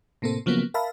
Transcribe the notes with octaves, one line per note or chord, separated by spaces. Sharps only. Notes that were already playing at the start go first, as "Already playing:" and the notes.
A2 C3 A#3 C4 A4
C#3 F3 F#3 A#3 B3
A#4 E5 F5 A5 B5